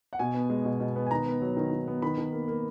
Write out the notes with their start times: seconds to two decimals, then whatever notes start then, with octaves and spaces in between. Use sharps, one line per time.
0.13 F#5
0.19 B2 G#5
0.34 B3
0.50 G#3
0.65 B2
0.80 B2
0.96 B3
1.07 G#5
1.11 D#3 A#5
1.26 B3
1.42 F#3
1.57 D#3
1.72 D#3
1.88 B3
2.02 D#3 B5
2.18 D#3
2.33 A#3
2.48 A#3